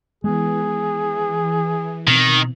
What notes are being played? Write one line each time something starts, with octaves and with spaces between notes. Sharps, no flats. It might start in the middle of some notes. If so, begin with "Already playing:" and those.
E3 G#3 A#3 B3 G#4
B2 D#3 C4